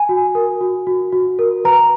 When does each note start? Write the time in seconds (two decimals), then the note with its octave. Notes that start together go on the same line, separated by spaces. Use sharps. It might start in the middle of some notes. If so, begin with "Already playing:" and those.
Already playing: G#5
0.09 F#4
0.35 A#4
0.61 F#4
0.87 F#4
1.13 F#4
1.39 A#4
1.65 B4 A#5